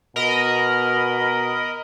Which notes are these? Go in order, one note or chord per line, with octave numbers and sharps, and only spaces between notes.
B2 A#4 D#5 B5